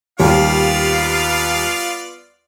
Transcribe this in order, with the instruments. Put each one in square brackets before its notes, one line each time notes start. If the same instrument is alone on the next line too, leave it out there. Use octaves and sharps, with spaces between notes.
[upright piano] D#2 [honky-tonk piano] G3 [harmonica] B3 F4 D5 [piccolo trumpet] F5